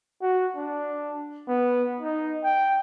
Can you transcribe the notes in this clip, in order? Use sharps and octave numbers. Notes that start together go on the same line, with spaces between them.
F#4
D4
B3
D#4
G5